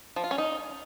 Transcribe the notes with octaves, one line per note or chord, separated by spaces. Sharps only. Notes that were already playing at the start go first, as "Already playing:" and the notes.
F3
F4
C#4
D#4